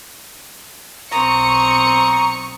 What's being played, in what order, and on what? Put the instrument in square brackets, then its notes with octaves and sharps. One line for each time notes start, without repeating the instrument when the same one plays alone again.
[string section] B1 C#6 C#7 [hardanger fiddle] C4 D#6 [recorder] A#5